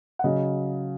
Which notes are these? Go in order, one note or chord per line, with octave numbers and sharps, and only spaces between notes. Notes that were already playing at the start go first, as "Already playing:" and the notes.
F#5
C#3 F#3 D#5